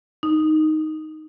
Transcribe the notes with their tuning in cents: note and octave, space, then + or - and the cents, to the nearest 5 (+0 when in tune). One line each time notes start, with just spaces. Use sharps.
D#4 +0